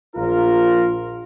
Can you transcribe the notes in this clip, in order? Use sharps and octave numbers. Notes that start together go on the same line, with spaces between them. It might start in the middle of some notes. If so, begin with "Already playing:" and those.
A#1 F4 A#4